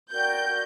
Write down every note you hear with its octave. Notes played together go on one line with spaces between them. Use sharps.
F#4 A#4 D5 G5 G6
F#4 A#4 D5